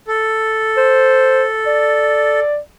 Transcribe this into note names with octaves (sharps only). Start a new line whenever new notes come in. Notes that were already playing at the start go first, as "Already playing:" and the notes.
A4
C5
D5